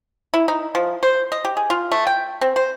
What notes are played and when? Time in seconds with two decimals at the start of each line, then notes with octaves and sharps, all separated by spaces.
0.34 E4
0.48 D#4
0.75 F3
1.03 C5
1.32 D#5
1.45 G4
1.57 G#4
1.70 F4
1.92 A3
2.07 G5
2.41 C4
2.56 C5